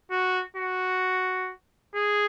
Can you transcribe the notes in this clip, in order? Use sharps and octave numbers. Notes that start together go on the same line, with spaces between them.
F#4
F#4
G#4